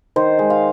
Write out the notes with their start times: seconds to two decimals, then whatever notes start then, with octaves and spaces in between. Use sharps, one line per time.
0.16 D#3 C5
0.39 G#3
0.50 F5